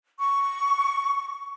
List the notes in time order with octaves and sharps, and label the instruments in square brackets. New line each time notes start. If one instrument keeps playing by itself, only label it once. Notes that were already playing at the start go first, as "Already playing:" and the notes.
[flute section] C#6